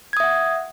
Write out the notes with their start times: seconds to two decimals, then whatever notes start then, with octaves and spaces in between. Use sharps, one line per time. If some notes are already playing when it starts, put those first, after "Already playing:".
0.13 G#6
0.17 D#6
0.20 E5
0.24 F#5